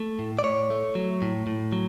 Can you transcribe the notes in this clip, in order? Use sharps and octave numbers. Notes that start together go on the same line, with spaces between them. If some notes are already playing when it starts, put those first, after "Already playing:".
Already playing: A3
A2
D5
A2 C#5
A3
F#3
A2
A2
F#3